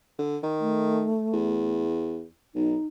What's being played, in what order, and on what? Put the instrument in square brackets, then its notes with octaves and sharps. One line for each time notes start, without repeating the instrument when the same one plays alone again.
[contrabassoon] D3
D#3
[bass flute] A3
[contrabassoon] E2
[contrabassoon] B1 [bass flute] D#4